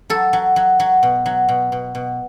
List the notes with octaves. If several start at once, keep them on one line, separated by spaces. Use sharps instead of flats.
F#3 A4
F#3
F#3
F#3
B2
F#3
B2
B2
B2